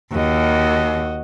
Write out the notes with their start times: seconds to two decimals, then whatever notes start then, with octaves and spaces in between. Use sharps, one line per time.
0.13 D#2 F#4 D#5